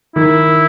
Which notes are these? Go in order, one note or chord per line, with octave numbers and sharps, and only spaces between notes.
D#3 E4